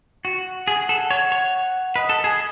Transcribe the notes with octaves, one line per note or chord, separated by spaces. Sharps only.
F#4 F#5
G#4
A4
C#5
C#5
B4 D#5
A4
G#4